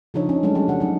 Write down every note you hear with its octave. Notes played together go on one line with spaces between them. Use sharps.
C#3 F3 D4 D#4 F4 C#5
C#4
F#3 G#3 A3 D4
F3 G3 C#4
C#3 F#5
F#3 D#4